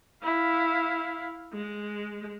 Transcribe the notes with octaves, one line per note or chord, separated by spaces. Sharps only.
E4 F5
G#3